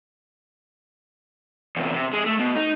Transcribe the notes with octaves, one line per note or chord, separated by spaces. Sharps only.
E2 C3
C3
G#3
A3
B2
D#4